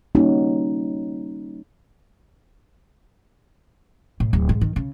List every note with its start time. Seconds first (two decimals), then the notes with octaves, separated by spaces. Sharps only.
0.15 G3 A#3 C#4 D#4 F#4
4.20 A2
4.33 D1
4.49 G#2
4.61 D#3
4.76 C#3